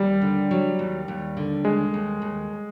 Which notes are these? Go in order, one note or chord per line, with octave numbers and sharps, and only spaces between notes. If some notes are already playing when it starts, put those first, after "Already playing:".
Already playing: D#2 G3
D3
F#3
D#2
D#2
D3
D#2 G#3
D#2
D#2